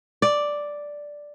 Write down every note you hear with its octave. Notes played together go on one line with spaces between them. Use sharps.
D5